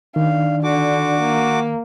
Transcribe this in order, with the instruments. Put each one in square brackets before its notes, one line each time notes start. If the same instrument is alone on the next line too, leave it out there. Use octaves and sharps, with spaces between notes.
[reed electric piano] D#3 [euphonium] D4 [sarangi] F5
[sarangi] D3 [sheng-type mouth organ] F#4 D6
[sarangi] A#3